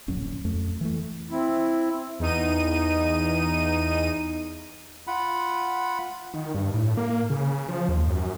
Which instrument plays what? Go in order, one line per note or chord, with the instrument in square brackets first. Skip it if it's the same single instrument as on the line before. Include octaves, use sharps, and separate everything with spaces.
[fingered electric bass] D1 A#1 F#2 C#4
F2 A3
E3 A3
[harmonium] C4 E4
[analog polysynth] E2 D#4 D#7
[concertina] F4 F#5 B5
[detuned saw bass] D#3
G2
A2
A#3
C#3
F3
D#2
F#2